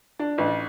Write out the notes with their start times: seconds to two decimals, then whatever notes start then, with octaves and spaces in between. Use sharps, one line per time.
0.19 D4
0.38 A1